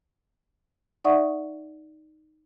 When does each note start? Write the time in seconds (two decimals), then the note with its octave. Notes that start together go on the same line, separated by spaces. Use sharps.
1.04 D#4 D5 E5 F#5 C#6 D#6